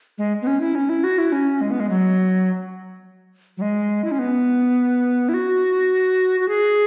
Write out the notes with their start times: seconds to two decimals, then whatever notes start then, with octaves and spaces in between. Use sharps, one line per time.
0.18 G#3
0.42 B3
0.47 C#4
0.61 E4
0.75 C#4
0.89 E4
1.04 F#4
1.18 E4
1.32 C#4
1.61 G#3
1.71 B3
1.80 G#3
1.90 F#3
3.57 F#3
3.61 G#3
4.04 E4
4.11 C#4
4.19 B3
5.29 E4
5.34 F#4
6.40 F#4
6.48 G#4